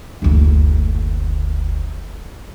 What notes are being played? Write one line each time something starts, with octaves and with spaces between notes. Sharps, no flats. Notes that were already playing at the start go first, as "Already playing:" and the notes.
F#1 D2